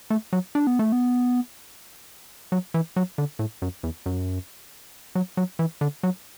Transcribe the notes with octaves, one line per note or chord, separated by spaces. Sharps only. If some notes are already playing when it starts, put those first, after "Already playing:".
A3
F#3
D4
B3
A3
B3
F#3
E3
F#3
D3
A2
F#2
E2
F#2
F#3
F#3
E3
D3
F#3